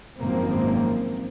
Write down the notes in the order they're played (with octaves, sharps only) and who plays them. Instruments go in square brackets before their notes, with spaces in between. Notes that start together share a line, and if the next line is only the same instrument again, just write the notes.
[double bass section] G#1 F#2 F3 A#3 C4